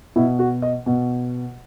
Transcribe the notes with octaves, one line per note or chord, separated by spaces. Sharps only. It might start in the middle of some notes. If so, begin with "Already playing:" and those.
B2 E4
F#4
D#5
B2